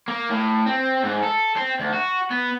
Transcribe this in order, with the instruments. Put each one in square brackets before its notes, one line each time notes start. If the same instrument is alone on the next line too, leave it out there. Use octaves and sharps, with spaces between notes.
[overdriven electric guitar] A#3
A2
C4
G#2
A4
C4
D2
F#4
B3